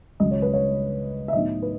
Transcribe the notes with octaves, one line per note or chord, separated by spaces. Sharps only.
C#2 C#3 F#3 D#5
C#5
B4
C#5
E5
A2 F#3 B3 D#4 D#5
B4